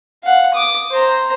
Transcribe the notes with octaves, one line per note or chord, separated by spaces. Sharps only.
F5 F#5
D6 D#6
C5 A#5